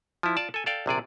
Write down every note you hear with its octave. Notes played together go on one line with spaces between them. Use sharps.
F3 E4
F4 D5 A5
A4 G#5
A4 D5 F5 G5
A#1 C3 G#4 D5